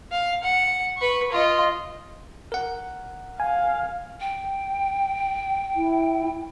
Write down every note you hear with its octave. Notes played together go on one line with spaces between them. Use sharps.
F5
F#5
B4 C#6
F4 D#5
A#4 F#5
F5 G#5
G5
E4